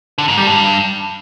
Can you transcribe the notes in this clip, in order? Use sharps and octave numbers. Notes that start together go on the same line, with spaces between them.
D3
G#2
G3
G2